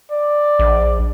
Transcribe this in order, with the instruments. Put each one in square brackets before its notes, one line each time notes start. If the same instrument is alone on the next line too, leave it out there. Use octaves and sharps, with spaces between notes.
[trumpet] D5
[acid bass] A#1